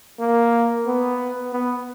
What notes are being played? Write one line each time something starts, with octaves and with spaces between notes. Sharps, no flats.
A#3
B3
B3